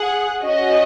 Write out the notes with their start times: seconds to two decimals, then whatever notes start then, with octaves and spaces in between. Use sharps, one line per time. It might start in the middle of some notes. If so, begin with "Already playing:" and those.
Already playing: G#4 F#5
0.43 C#4 F#4 D#5